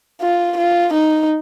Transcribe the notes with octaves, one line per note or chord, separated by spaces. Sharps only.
F4
F4
D#4